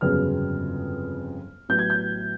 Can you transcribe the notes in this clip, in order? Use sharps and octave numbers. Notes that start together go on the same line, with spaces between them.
G1 F2 C#3 F#3 B3 F6
A1 A2 F#3 B3 G6
G#6
G6